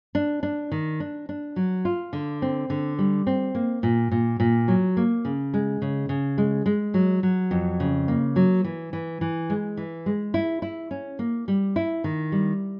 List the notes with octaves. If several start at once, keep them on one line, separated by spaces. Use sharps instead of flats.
D4
D4
D#3
D4
D4
F#3
F4
D3
C4
D3
G3
C4
A#3
A#2
A#2
A#2
F#3
A#3
C#3
G#3
C#3
C#3
G#3
G#3
F#3
F#3
F2
C#3
A#3
F#3
E3
E3
E3
G#3
E3
G#3
E4
E4
C#4
A#3
G3
E4
D#3
G3